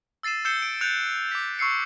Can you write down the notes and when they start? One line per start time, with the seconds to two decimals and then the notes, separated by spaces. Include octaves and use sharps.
0.23 E6 A6 C7 D#7 E7
0.45 E6 G6 C7 C#7 E7 G7
0.62 D7
0.81 F#6 G6 A6 C#7 D7 F7
1.31 D6 B6
1.59 C#6 E6 C7 C#7